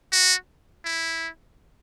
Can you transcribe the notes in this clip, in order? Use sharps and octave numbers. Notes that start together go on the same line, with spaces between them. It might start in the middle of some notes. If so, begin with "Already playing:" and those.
F#4
E4